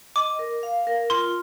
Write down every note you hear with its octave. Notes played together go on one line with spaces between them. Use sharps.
D#5 D6
A#4
F5
A#4
F4 C6